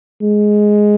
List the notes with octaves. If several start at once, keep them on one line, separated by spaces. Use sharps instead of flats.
G#3